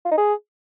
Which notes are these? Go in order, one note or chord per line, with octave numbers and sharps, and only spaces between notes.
F4
D#4
G#4